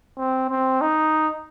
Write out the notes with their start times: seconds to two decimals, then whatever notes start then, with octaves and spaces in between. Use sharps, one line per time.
0.18 C4
0.50 C4
0.81 D#4